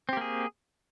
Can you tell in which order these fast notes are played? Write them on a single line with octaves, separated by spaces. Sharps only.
C4 G4 A#3 G#4